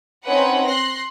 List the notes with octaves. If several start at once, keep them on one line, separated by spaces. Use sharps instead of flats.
C4 C#4 D#4 B4 F#5
C6 F#6 A#6 C7